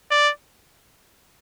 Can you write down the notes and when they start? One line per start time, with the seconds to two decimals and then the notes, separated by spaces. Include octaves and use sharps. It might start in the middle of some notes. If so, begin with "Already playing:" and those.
0.11 D5